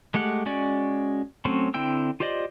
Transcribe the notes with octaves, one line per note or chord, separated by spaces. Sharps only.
G#3 A3 G4 F#5 F#6
G#3 C#4 F#4 D5
F#3 A3 C4 C#4
D3 C4 E4 G5 E6
F4 G4 C5 D5 D#5